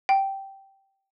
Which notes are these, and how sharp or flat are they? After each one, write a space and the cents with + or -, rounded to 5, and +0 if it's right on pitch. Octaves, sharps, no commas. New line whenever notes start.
G5 -10